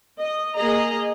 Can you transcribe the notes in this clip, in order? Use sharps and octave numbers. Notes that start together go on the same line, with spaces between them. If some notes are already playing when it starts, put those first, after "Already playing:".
D#5
A#3 G#4 D#5 A#5